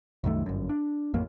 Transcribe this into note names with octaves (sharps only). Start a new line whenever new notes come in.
C2 F#2 D#3 A3
G1 F#2
D4
A1 F2 A#3